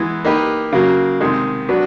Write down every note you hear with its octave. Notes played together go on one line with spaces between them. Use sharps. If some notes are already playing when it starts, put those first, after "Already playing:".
Already playing: E3 G#3 B3
A#3 D#4 G4 B4
C#3 F#3 A#3
C3 D#3 G#3
F#3 B3 D4 F#4 B4